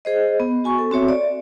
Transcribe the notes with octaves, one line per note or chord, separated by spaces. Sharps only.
G#4 C5 D#5
B3
F#4 G#5 C#6
A4
C4 F#4 C#5 E5
D5